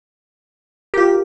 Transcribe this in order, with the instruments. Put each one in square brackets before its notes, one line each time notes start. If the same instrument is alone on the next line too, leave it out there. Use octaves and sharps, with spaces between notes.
[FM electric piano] F4 A#4 [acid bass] G4